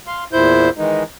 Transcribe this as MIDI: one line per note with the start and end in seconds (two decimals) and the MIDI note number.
0.07 0.24 77
0.07 0.24 84
0.33 0.70 40
0.33 0.70 46
0.33 0.70 64
0.33 0.70 72
0.33 0.70 91
0.77 1.03 51
0.77 1.03 52
0.77 1.03 56
0.77 1.03 63